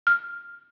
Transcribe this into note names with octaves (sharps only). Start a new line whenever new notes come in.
F6